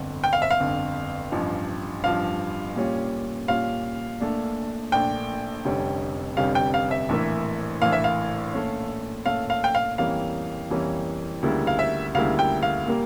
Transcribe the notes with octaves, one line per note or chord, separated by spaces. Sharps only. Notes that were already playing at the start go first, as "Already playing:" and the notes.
Already playing: G1 F2 D3
G5
F5
E5
F5
G1 F2 D3
A1 G2 F3
A1 G2 F3 F5
A#2 G3 C#4 F4
A#2 G3 C#4 F4 F5
A#1 A#2 A3 D4
A#1 A#2 A3 D4 G5
F1 F2 D3 G3 C#4
F1 F2 D3 G3 C#4 F5
G5
F5
E5
A#1 A2 E3 A#3
A#1 A2 E3 A#3 F5
E5
F5
A#2 A3 C#4
A#2 A3 C#4 F5
F5
G5
F5
F2 E3 G3 A#3 C#4 F5
F2 E3 G3 A#3 C#4
D2 C#3 G3 A#3 E4
F5
E5
D2 C#3 G3 A#3 E4 F5
G5
F5
A#2 G3 A#3